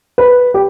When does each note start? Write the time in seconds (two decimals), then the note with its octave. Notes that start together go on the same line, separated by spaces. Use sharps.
0.18 B4
0.54 G4